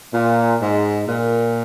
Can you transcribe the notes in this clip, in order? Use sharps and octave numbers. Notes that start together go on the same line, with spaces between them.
A#2
G#2
A#2